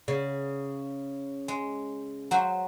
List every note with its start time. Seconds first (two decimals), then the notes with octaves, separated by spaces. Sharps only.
0.08 C#3
1.48 G#3
2.31 F#3 F#4 C5